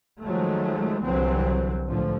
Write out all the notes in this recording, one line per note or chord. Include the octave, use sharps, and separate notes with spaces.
D#3 F3 F#3 G#3 A3
C2 D3 E3 F#3 C4
A1 G#2 D3 F3 A3